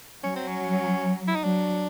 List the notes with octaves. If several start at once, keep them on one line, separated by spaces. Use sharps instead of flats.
F#3 C#4
C4
C#4
E4
D#4
F#3 D4